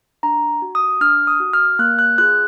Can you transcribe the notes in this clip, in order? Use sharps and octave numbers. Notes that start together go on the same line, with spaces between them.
D4 A#5
F#4
D#6
D4 F6
D#6
F#4
F6
A#3 F#6
F#6
F4 G#4 F#6